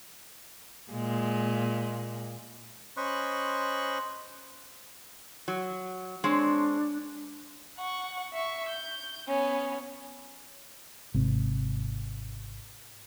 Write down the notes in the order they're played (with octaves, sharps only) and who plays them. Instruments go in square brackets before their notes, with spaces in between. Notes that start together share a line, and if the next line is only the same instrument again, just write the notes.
[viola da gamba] A#2 G#3
[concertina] C#4 C5 D#5 B5 C#6 F#6
[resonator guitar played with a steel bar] F#3
[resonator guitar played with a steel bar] G#3 C4 C#5 [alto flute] D4
[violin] F#5 C#6
E5 C#6
G6
B3 C#4
[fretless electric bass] G#1 C3